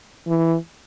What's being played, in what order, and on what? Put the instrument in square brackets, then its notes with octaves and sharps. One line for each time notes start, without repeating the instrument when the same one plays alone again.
[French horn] E3